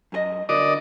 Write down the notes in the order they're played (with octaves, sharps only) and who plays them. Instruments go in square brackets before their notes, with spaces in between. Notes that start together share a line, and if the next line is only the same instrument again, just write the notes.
[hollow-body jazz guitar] F#2 G#4 D#5
[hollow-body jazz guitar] D3 F#4 A#4 [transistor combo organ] D5 D#5